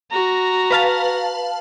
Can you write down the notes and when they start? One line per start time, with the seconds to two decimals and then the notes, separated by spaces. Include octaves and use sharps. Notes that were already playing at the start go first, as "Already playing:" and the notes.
0.11 F#4 A#5
0.71 B4 F5 A5